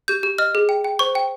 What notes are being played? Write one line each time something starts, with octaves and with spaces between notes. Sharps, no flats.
G4 G6
G4
D#5 F6
G#4
G5
G5
C5 C#6
G5